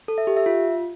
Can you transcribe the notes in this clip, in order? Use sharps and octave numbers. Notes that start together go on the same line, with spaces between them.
A4
E5
G4
E5
F4